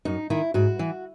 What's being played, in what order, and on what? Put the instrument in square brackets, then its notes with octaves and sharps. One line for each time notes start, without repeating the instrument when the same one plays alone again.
[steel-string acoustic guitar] F#2 D#4
D#3 E4
G#2 F#4
E3